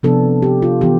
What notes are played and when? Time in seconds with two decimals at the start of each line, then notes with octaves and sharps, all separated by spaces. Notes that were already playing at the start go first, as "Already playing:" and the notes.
0.03 C3 F3 B3 D4 A4
0.42 G4
0.62 F4
0.81 E3 B3 G4